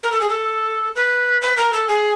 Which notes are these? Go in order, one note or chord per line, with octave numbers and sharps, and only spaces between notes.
A#4
A4
G#4
A4
B4
B4
A#4
A4
G#4